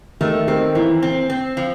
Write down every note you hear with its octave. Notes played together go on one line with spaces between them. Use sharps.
D#3 A3
D#3 C4
A#2 E3
C4
C4
F3